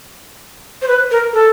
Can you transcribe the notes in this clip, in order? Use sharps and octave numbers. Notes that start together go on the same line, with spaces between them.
C5
B4
A#4
A4